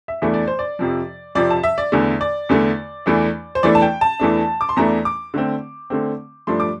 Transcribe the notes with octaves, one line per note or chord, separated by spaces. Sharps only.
E5
E2 E3 A3 D4 E5
D5
C5
D5
F2 C3 F3
F2 C3 F3 D5
A5
E5
D5
E2 D3 A3
D5
E2 D3 A3
E2 E3 A3 D4
C5
E2 E3 A3 D4 D5
A5
G5
A5
E2 E3 A3 D4
D6
C6
E2 E3 A3 D4 A#5
D6
D3 A3 C4
D3 A3 C4
G2 F3 A3 D4 C6
D6